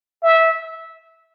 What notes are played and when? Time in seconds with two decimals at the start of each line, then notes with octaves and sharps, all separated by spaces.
0.23 E5